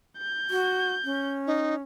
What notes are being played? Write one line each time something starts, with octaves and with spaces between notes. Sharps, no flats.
G6
F#4
C#4
D#4